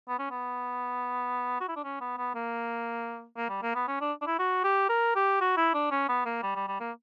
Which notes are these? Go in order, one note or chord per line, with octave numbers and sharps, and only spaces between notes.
B3
C#4
B3
F#4
E4
D4
C#4
B3
B3
A#3
A#3
G3
A#3
B3
C#4
D4
D4
E4
F#4
G4
A#4
G4
F#4
E4
D4
C#4
B3
A#3
G3
G3
G3
A#3